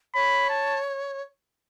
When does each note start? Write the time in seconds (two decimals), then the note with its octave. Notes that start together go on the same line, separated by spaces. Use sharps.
0.15 C#5 B5
0.50 A5